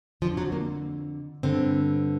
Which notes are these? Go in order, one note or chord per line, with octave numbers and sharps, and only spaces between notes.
F2 D3 F3
F#3
A#3
G2 D3 C4